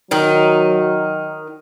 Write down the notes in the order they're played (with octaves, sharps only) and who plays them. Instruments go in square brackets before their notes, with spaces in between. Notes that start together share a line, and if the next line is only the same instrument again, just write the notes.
[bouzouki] D#3 D#4 [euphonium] F#3